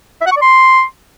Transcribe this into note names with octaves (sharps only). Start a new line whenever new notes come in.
E5
F#5
C#6
D5
C6